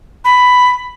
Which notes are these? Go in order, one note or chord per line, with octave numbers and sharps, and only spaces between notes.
B5